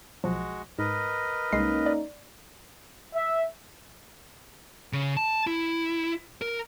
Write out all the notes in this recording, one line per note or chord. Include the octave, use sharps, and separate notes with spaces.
B1 F3 G#3 F#4
G#2 A#4 B4 D#5
C2 G#3 A#3 C#4 D#4 C7
D5
E5
C#3
A5
E4
A#4